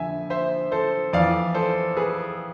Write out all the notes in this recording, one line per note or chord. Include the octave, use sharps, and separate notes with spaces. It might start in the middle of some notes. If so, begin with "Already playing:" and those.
Already playing: F2 D3 F3 E5 G#5
C5 E5
A4 C5
F2 E3 D5 F5
A4 C5
G#4 B4